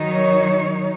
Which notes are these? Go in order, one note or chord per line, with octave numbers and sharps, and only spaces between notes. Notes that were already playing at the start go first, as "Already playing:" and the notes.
Already playing: D#3 F#3 D#4
C#5